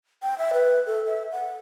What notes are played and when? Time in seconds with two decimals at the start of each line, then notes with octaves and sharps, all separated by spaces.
0.22 G5
0.38 E5
0.53 B4
0.86 A4
1.06 E5
1.32 F#5